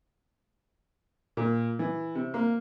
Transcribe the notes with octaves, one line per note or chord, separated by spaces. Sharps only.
A#2
E3
C3
A#3